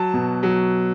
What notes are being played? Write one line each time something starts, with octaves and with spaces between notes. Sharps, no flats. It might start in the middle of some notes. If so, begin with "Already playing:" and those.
Already playing: F#3 A5
B2
F#3